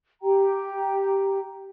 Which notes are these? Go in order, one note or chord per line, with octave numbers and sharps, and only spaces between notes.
G4 G5 A#5